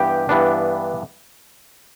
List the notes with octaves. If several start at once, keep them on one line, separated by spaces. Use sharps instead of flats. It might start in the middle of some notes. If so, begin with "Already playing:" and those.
Already playing: G2 E3 B3 G4 G5
G2 E3 B3 D4